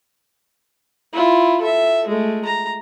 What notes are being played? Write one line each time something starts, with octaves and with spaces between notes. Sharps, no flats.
E4 F4
A4 E5
G#3 A3
A#5